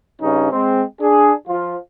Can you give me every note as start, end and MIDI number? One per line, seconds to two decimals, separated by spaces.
0.21 0.49 43
0.21 0.49 49
0.21 0.49 61
0.21 0.49 63
0.52 0.82 56
0.52 0.82 60
1.01 1.32 62
1.01 1.32 68
1.47 1.76 53
1.47 1.76 65